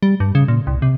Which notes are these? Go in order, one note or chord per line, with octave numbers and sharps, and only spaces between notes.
G3
G2
C#3
A#2
C2
C3